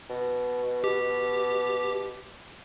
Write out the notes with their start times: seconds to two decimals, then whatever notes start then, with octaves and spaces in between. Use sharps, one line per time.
0.10 B2
0.84 G4